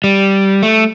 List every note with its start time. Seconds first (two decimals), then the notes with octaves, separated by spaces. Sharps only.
0.04 G3
0.63 A3